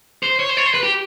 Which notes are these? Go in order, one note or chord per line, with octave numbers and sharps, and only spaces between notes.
C5
C#5
C5
C#5
C5
B4
G4